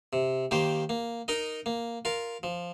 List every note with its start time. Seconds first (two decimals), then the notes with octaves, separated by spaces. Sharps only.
0.13 C3
0.51 D#3 A#3 G4 C5
0.89 A#3
1.28 D#4 A#4 D#5
1.66 A#3
2.05 F4 A#4
2.43 F3